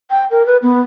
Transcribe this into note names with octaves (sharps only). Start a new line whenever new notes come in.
G5
A#4
B4
B3